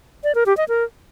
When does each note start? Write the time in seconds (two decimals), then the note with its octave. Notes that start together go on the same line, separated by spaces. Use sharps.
0.24 D5
0.35 A#4
0.46 G4
0.57 D#5
0.68 A#4